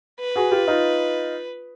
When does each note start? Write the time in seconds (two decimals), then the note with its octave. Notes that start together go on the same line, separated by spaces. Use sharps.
0.20 B4
0.36 F#4 G#4
0.51 F4 G4
0.67 D#4 F4